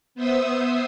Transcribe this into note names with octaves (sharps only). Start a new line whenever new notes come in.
B3 C5 E5 D#6 E6